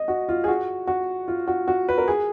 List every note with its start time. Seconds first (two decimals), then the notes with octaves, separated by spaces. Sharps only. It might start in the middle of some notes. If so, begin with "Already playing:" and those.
Already playing: D#5
0.08 F#4
0.29 F4
0.44 G#4
0.48 F#4
0.87 F#4
1.28 F4
1.47 F#4
1.68 F#4
1.89 B4
1.98 A#4
2.08 G#4